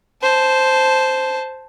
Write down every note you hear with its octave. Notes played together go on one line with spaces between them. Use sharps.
C5 A5